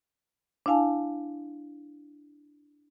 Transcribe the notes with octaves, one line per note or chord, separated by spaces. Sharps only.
D4 E4 F5 G#5 A5